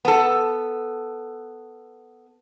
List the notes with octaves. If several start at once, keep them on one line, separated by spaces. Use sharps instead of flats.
B3 A4